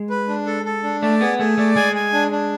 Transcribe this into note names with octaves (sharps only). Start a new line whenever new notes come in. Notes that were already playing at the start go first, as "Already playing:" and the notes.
Already playing: G#3
B4
D4
A4
A4
D4
A3 D5
B3 G#4
A3 G#4
A3 D5
G#3 G#5
G#5
D4
D4